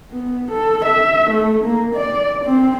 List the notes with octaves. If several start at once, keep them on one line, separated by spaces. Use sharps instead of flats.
B3
A4
E5
A3
A#3
D5
C4